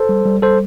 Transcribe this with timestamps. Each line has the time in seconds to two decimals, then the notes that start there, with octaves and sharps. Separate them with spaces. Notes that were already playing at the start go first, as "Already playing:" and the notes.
Already playing: A4 C5
0.09 G3
0.25 G3
0.42 G3 A4 C5